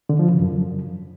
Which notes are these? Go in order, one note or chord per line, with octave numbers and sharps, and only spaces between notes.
D3
F3
C#3
F#2